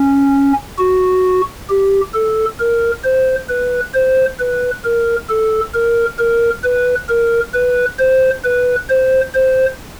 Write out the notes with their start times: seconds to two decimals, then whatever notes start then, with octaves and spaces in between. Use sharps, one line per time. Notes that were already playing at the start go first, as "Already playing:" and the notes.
Already playing: C#4
0.78 F#4
1.69 G4
2.14 A4
2.60 A#4
3.04 C5
3.49 B4
3.94 C5
4.39 B4
4.84 A#4
5.29 A4
5.74 A#4
6.19 A#4
6.64 B4
7.09 A#4
7.54 B4
7.99 C5
8.44 B4
8.89 C5
9.34 C5